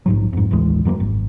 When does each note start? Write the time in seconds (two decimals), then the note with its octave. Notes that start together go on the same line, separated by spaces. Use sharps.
0.06 A#1 G#2 F#3
0.33 F2 G#2
0.51 A1 D#2 E3 G#3
0.85 F#2 F#3 A3 A#3
1.00 G#1